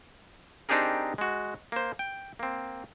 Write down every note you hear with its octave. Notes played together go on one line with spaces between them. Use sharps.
C4 D4 D#4 G4 G#4 A#4
G#3 F#4
A#3 C5
G5
A#3 C4